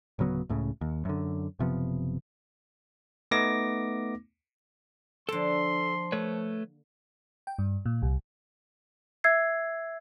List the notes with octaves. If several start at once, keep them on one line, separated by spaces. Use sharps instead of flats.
D1 C#3 F#3 B3
C#2 A2 C#3
D#2
F#2 D3
F#1 C3 F3 B3
A3 B3 D#4 D6 A#6
D3 F3 A#3 A4 C6
A3 B4 C#5
G5
G2
A#2
C2
E5 E6 G#6 C7